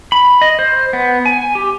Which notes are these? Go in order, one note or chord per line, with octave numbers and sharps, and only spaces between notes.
B5
D#5
C5
B3
G#5
G4